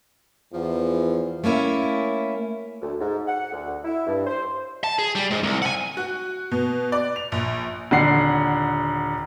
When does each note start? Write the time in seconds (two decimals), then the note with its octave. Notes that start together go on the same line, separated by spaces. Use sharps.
0.53 E2 F3
1.44 A3 A#3 C#4 E4
2.82 D2
3.00 G#2
3.27 F#5
3.53 D2
3.85 E4
4.07 G2
4.26 C5
4.84 A5
4.99 G#4
5.15 G3
5.31 G#2
5.43 C2
5.62 F#5 G#5
5.97 F#4
6.51 B2
6.92 D5
7.16 F7
7.32 A#1
7.91 D#1 D3 F#5 C7